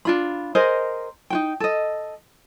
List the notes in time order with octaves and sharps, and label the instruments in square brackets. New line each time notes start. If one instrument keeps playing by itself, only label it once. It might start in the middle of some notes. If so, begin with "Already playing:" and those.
[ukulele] D4 F4 B5
G#4 A#4 C5 D#5
D#4 F#4 G5
A4 D#5